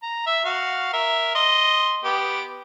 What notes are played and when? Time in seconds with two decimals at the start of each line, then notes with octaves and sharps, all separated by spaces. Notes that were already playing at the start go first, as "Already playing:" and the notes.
0.02 A#5
0.26 E5
0.45 F#4 F5
0.93 A#4 E5
1.35 D#5 C6
2.04 B3 G4